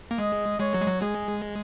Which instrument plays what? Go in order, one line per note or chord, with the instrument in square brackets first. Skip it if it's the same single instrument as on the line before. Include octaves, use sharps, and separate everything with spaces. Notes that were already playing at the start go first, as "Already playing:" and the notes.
[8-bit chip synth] A#3
[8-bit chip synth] G#3 [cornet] D#5
[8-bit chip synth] G#3 [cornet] C#5
[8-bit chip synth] F#3
G#3
F#3
[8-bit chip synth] G#3 [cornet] G#4